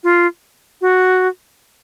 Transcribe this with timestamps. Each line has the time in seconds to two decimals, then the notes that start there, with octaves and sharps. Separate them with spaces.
0.04 F4
0.81 F#4